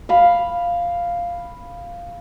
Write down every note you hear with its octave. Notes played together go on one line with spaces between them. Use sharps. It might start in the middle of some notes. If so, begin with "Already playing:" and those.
F5 B5